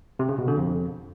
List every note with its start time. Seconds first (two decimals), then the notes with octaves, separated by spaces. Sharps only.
0.19 C3
0.29 C#3
0.38 B2
0.48 D3
0.57 F2